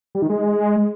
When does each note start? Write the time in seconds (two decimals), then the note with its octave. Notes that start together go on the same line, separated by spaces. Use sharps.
0.15 G3
0.22 D#3
0.29 G#3